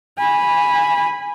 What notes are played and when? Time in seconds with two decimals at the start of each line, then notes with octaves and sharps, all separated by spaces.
0.18 G#5 B5